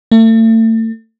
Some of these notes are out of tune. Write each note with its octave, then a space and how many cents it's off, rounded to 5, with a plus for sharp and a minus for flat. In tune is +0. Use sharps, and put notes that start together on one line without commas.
A3 +35